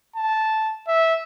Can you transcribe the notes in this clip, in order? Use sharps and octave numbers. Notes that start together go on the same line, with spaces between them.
A5
E5